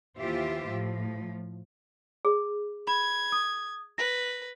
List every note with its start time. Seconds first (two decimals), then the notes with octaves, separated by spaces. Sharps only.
0.18 D#2 E3 F4 G4 C5 E5
0.69 A2 F3
2.25 G#4
2.87 B5 G#6
3.32 D#6
3.98 B4 A#6